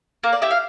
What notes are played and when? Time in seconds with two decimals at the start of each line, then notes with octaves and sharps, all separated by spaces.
0.23 A#3 A#4
0.33 D5
0.42 E4 G4 E5
0.51 F5